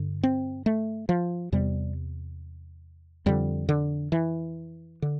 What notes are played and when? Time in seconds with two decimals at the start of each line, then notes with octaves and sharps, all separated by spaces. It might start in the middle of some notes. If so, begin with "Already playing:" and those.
Already playing: G2 D3
0.23 C4
0.66 A3
1.09 F3
1.52 E2 C3 G3
3.26 F2 D3 G3
3.69 D3
4.12 E3
5.02 D3